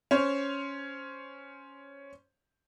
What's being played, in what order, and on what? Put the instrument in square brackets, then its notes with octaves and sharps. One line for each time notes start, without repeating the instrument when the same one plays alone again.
[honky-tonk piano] C#4 C5 C#5